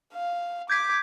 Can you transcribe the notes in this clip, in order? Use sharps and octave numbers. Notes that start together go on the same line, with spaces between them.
F5
D6 G6 G#6 B6